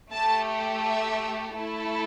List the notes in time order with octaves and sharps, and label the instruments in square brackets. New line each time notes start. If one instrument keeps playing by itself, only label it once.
[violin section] A3 G4 A5
E5
A3 E4 A4